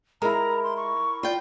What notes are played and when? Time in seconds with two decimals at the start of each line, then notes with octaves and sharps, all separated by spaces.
0.22 G#3 E4 A#4 A#5
0.63 C6
0.77 C#6
1.23 F4 D5 G5